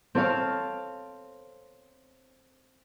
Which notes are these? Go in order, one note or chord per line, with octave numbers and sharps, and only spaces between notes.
C4 A4 C#5 F5 A5